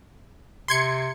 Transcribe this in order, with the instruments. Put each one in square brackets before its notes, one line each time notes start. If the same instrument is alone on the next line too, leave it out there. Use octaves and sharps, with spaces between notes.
[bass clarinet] C3 [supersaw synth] C6 G#6 C#7